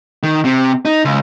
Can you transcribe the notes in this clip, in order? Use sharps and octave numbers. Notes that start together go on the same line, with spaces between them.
D#3
C3
D#4
C#2